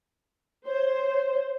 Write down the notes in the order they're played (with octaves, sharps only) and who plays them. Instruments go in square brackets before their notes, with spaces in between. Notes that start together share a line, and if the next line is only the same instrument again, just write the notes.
[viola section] C5 [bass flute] C#5